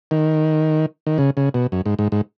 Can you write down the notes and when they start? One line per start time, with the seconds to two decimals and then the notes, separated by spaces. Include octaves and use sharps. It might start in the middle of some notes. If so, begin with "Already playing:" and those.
0.11 D#3
1.07 D#3
1.18 C#3
1.37 C#3
1.54 B2
1.72 F#2
1.86 G#2
1.99 G#2
2.12 G#2